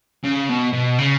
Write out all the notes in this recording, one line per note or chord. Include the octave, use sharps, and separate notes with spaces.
C#3
B2
B2
C#3